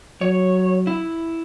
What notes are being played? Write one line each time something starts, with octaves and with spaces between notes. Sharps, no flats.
F#3 C#5
E4